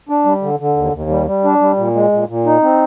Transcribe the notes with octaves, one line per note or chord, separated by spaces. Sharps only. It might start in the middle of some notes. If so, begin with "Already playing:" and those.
D4
G3
D3
D3
D#2
D#2
G3
G3
D4
G3
A#2
G#3
A#2
A#2
D#4
C4